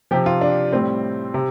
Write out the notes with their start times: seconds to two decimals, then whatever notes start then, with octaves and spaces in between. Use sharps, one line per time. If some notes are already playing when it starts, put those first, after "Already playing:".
0.11 C3 F3 G4
0.26 F4
0.41 D4
0.72 A2 G3 C4
1.34 C3